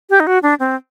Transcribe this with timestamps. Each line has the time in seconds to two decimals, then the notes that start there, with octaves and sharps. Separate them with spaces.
0.10 G4
0.20 D#4
0.27 F#4
0.43 D4
0.60 C4